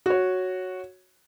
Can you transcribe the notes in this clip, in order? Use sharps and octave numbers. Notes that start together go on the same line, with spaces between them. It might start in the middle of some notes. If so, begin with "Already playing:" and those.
F#4 C#5